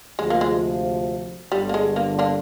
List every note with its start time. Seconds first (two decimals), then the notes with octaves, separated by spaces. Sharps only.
0.18 D2 C3 F3 G#3
0.30 A#3
0.41 G#3
1.52 G1 G2 D3 G3
1.69 A#3
1.74 G#3
1.96 A#3
2.19 A#3 D4